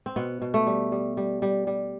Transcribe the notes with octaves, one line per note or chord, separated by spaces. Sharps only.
C4
B2 B3
B2
A3
G3
G3
G3
G3
G3